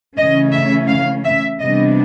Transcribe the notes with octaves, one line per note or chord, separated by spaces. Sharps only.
C#3 E3 A3 C#4 D#5
E5
F5
E5
C3 E3 G3 B3 D4 D#5